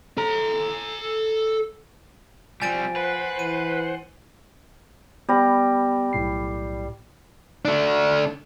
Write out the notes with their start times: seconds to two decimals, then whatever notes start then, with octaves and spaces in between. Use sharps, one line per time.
0.17 A4 A#5
2.62 F3 G3 C4 G#5 A6 D7
2.96 B4 C5 F#5
3.39 E3 D#7
5.29 G3 B3 A#6
6.13 B1 A2 C7
7.65 A3 D4